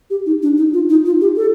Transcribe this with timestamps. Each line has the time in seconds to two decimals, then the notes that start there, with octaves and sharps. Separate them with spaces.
0.10 G4
0.26 D#4
0.42 D4
0.57 D#4
0.73 F4
0.89 D#4
1.06 F4
1.21 G4
1.37 A4